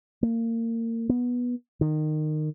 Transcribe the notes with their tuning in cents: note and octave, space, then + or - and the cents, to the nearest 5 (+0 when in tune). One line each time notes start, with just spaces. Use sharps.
A#3 -30
B3 -15
D#3 -20